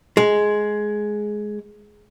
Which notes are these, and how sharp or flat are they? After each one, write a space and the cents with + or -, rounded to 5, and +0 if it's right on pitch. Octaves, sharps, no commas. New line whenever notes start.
G#3 +10